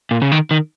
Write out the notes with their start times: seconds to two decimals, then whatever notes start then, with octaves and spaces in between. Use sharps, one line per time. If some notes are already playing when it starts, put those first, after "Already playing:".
0.11 A#2
0.22 C#3
0.32 D#3
0.51 D#3